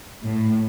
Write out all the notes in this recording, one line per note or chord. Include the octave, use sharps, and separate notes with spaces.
A2